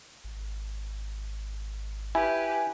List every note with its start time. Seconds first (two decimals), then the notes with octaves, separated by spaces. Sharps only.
0.24 G#1
2.15 E4 G4 B4 G#5